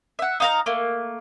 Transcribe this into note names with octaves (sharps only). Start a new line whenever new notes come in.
E5 F#5
D#4 F5 A#5
A3 A#3